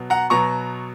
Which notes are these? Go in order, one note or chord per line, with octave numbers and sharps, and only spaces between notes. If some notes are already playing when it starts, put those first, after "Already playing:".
Already playing: B2 F#3 B3
F#5 A#5
B2 F#3 B3 A#5 C#6